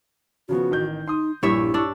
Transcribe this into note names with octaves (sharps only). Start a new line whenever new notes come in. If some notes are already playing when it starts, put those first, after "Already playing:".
C#3 F3 B3 F#4
A1 D#3 G6
D#4 C6 D#6
A#1 G2 A#2 E4 C#5 E5
D4 C#6 E6